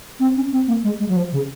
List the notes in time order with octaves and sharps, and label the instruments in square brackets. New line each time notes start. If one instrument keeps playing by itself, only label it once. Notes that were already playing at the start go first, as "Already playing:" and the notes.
[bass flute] C4
C#4
C4
A#3
G#3
G#3
F#3
F3
C#3